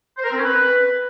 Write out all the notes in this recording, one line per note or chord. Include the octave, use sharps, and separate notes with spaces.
C5
A#4
C4
C#4
B4